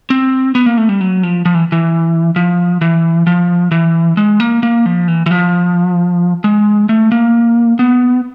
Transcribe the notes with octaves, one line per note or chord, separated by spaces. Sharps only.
C4
B3
A#3
A3
G3
F#3
F3
F3
E3
E3
F3
E3
F3
E3
G#3
A#3
A#3
F3
E3
E3
F3
G#3
A3
A#3
B3